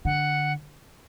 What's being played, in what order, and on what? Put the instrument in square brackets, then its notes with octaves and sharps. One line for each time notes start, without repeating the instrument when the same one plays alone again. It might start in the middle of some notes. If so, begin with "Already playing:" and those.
[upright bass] D3 [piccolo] F#5